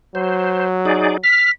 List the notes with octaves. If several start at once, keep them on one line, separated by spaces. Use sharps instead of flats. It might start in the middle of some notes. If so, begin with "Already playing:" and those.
F#3 C5
D#4 G#4 D5
F6 B6